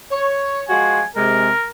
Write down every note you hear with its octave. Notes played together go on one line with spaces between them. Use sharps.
C#5
F3 G#3 F#4 G#5
C3 G#3 A#4